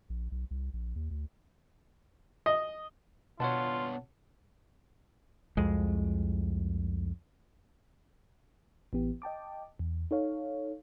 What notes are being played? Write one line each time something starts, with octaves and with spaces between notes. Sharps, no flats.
A#1
B1
C2
A#1
D#2
D2
D#5
B2 B3 D4 F4 C#5 F#5 A5
C2 F2 G#3
A1 E3 B3 G4
D#5 G5 A5 D6
E2
D#4 A4 C#5 F5